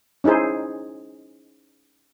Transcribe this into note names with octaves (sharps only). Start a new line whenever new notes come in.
C#4 D#4 E4 G#4 C5